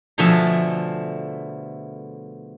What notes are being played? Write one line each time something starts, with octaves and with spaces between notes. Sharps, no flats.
B2 D3 F3 A3 G#4 E5